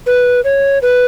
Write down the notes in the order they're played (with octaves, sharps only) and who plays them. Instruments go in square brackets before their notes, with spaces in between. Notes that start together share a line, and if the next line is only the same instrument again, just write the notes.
[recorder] B4
C#5
B4